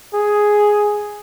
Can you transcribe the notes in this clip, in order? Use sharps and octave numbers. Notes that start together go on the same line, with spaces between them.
G#4